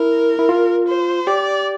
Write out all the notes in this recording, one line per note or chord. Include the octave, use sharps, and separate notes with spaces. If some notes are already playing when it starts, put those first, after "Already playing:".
Already playing: E4 A#4
E4
F4
C5
G4 D5